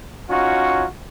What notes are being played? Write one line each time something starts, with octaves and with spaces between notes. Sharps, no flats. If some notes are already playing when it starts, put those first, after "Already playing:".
C#4 D#4 F4 F#4